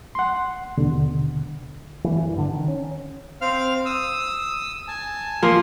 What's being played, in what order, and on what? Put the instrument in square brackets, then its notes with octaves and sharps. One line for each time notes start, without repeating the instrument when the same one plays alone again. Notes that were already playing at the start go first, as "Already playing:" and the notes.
[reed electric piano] F#5 C6
D#2 B2 D3
[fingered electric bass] E3
G2
D3
D#3
C#4
[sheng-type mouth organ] C4 F5 F6
D#6 E6
G#5 A5
[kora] F3 A#3 [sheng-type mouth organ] C6